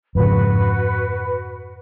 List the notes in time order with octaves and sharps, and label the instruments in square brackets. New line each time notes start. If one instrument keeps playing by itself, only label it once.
[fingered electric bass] F2 G#2 C#3 [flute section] F#4 B4